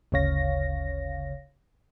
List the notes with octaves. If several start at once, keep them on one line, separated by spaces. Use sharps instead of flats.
G1 D2 C#3 C#5 F5 A#6